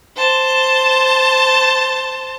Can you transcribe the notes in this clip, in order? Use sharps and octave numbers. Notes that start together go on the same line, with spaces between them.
C5 A5